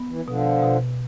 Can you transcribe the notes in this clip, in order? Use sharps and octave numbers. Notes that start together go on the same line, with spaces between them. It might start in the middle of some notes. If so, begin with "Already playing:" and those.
Already playing: B3
E3
B2 D3 F3
B2